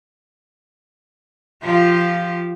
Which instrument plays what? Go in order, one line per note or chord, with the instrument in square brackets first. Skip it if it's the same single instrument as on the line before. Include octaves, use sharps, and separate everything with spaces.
[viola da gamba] F3 F4 G4